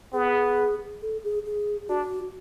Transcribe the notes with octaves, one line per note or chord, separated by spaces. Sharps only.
B3 G#4
A4
G#4
G#4
D4 F#4